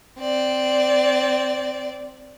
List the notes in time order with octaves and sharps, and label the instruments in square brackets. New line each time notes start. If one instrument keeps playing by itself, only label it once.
[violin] C4 D5